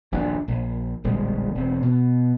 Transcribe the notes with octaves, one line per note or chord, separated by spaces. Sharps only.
D#1 A#1 F#2 D4
A#1
D1 A#1 G3 G#3
E1 C4
B2